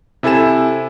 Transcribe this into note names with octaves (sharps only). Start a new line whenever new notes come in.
C3 E4 A4 G#5 E7